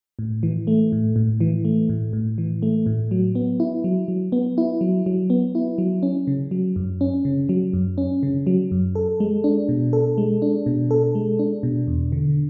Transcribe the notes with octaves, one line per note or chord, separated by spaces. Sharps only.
A2
E3
A3
A2
A2
E3
A3
A2
A2
E3
A3
A2
F#3
B3
E4
F#3
F#3
B3
E4
F#3
F#3
B3
E4
F#3
C#4
C#3
F#3
F#2
C#4
C#3
F#3
F#2
C#4
C#3
F#3
F#2
A4
G#3
D4
B2
A4
G#3
D4
B2
A4
G#3
D4
B2
E2
D3